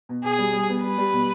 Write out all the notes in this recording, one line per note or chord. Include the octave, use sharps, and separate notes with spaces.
B2
B2 G#4
G3
G3
B3
G3 B4
G3
B2